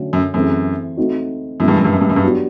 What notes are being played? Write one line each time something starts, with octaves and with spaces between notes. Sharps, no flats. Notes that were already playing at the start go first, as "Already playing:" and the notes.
Already playing: D3 F#3 A3 C#4
F#2
F#2 E3 A3 C4 E4 G#4
A3 C4 D#4 F#4
F#2 E3 G#3 B3 E4
G2
F#2
G2
F#2
G2
F#2
G2
F#3 B3 D4 G4